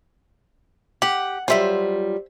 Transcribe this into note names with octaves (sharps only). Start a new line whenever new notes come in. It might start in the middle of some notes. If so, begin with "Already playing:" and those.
G4 F#5
F#3 G3 F4 C5 E5